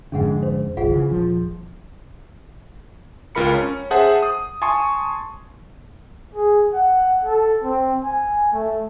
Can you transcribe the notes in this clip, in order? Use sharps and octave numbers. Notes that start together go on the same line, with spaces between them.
F2 G#2 D3 C#4 G#4 F#5
C5
G1 C2 F4 G#4 F#5
C#3 E3
D#1 F3
C#2 F4 A#4 B5 C#7
C#4
G#4 C5 E5 F#5 A5
D#6
G#5 A5 C6 C#6 D#6
G#4
F#5
A4
C4
G#5
A3